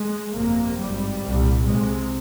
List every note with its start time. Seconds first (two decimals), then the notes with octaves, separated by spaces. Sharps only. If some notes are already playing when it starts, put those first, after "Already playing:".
Already playing: G#3
0.33 G1 F2 C3 A#3
0.77 G#1 G2 G3
1.22 C2 A#2
1.67 C2 C3 G#3